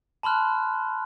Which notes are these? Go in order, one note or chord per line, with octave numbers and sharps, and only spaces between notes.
A5 B5 C6 F6 F#6